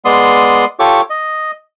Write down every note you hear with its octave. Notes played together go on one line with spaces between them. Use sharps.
G#3 B3 D5 C6 D#6
F4 G4 A4 C#5 C#6 D6
D#5